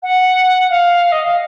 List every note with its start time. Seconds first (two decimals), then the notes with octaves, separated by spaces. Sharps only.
0.03 F#5
0.70 F5
1.12 D#5
1.24 F5